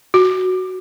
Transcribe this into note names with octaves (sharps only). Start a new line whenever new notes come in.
F#4